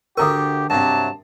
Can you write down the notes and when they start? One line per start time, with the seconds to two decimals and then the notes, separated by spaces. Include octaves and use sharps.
0.17 D2 D3 G4 A#4 A#5 C#6 D#6
0.70 G2 C3 F#3 A5